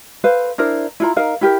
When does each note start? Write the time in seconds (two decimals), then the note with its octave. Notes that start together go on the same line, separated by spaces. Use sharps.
0.24 A4 B4 C5 F5
0.58 D4 E4 A#4 C5
1.00 E4 F4 A#5
1.16 D#4 A#4 F5
1.41 E4 G4 A#4